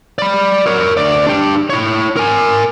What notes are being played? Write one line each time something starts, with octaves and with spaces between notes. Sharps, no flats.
D5 B5
A#4 C#5
D2 D5
D4 G4
E4 C#5
A#4 G#5